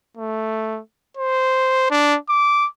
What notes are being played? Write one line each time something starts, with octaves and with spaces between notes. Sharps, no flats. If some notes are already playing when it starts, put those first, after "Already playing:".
A3
C5
D4
D6